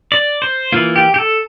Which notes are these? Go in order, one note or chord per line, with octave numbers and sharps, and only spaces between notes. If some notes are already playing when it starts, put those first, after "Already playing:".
D5
C5
E3 A#3 F4
G4
G4
A4